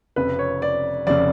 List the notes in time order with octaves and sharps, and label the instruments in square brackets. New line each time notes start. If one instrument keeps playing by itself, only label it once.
[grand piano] F1 F2 C#3 B4
C#5
D5
F1 C#3 D5